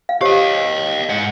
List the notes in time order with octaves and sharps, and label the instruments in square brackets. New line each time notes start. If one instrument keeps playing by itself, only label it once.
[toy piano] F5
[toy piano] G4 C5 C#5 [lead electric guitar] D#5 F5
[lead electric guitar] G#2 F#5